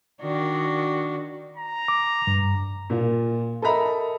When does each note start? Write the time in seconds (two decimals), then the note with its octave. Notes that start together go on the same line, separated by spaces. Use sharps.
0.22 D#3 D4 F#4
1.56 A#5
1.88 D6
2.27 G2
2.90 A#2 F4
3.62 A4 A#4 D#5 E5 A#5 B5